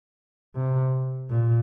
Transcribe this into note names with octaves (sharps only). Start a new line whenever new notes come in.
C3
A#2